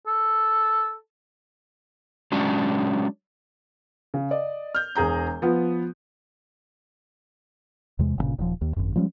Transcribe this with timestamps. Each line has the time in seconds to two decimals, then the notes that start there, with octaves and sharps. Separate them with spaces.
0.07 A4
2.32 F#3 G#3 C#4 D4
4.14 C#3
4.31 D5 D#5
4.75 F6 G6
4.95 E1 G#4 A#5 G6
5.42 F3 B3
7.99 E2 C3 G#3
8.18 G1 G2 A#2 C#3
8.39 D#1 D#3 F3
8.61 D#2
8.76 G#1 F#2
8.96 F3 G3 G#3 C#4